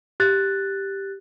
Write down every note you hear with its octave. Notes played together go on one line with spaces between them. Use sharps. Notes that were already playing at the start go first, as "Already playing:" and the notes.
G4 F#6 A6